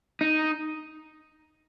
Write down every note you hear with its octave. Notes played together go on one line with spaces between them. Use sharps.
D#4